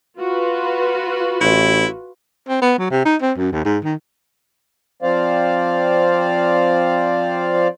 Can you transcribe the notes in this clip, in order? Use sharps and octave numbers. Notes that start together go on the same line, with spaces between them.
F4 F#4 B4
A1 E4
C4
B3
F#3
C3
D#4
C4
F#2
D#2
G#2
D#3
F3 C4 C5 D5 F5